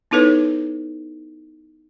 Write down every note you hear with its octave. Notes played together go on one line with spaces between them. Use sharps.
B3 D#4 E4 A4 B4 C#5